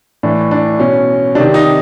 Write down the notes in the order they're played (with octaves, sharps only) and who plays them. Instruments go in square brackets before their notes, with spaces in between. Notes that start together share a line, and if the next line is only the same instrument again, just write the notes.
[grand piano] A2 E3 D4
D4
B2 C#4
C3 D#3 D4
D#4